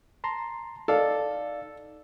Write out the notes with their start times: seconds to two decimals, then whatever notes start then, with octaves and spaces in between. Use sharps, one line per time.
0.24 A5 A#5 C6
0.88 D#4 A4 D5 F5